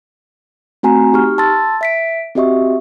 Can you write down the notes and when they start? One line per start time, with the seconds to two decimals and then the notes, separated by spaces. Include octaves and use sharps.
0.83 A3 C4 F#4 G#5 A#5
1.13 D#4 G4 C#6 F6
1.38 A5 C6 E6 A6
1.81 E5 B6 D7
2.35 C4 F#4 G4 D#5 E5 C#6